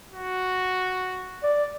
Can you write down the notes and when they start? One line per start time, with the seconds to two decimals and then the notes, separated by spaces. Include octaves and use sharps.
0.11 F#4
1.43 D5